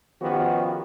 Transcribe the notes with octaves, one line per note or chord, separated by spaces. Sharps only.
D#3 F3 B3 C#4 F#4 G4